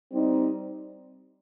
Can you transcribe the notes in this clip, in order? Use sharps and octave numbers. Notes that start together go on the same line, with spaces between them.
G3 C4 D#4